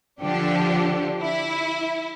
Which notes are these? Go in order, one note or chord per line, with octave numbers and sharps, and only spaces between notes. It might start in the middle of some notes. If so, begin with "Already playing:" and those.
D3 F3 D4 G4
E4